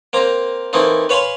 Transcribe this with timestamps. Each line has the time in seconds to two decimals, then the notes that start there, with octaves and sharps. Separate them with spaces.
0.13 A#3 C4 A#5
0.73 E3 A3 A#3 C4 D#4
1.09 B4 C#5 F5 G#5 B5 C6